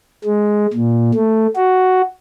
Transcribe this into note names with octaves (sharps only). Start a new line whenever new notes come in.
G#3
A#2
A3
F#4